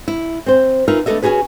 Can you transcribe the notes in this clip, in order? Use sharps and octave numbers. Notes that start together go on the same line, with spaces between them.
E4
C4 C5
D#4 F4 A#4 B4 E5
A3 B3 D4 A4 D#5 E5
C#4 D#4 F#4 G#4 B4